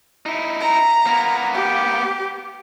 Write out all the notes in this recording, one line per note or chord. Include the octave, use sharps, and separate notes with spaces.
D#4 E4
A#5
A#3 B3
G4